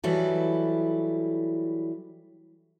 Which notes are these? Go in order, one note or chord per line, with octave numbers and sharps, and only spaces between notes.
E3 F#3 G3 E4 A4